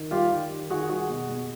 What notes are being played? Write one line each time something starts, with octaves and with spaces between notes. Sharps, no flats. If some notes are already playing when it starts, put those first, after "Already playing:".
Already playing: D#3
G3 F4 G4
D#3
D#3
D#3 F#4 G#4
G3 F#4 G#4
B2
B2